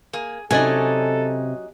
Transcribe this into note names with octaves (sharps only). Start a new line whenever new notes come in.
A#3 G#4
C3 F#3 C#4 D#4 A4 D5 D#5 G#5